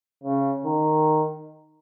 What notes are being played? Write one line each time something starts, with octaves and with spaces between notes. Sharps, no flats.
C#3
D#3